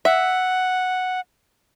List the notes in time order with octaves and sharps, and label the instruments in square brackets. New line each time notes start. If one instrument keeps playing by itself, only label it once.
[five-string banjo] E5 [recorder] F#5